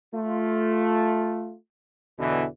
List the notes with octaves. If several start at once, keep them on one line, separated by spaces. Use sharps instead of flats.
A3 F4
E2 B2 D3 E3